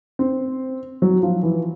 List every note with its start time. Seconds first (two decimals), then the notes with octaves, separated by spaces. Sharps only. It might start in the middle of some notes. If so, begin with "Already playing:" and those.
0.19 C4
1.02 F#3
1.23 F3
1.43 E3